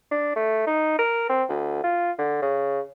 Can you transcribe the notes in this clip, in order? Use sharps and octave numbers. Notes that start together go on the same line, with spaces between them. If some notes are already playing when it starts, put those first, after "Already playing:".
D4
A3
D#4
A#4
C4
D2
F4
D3
C#3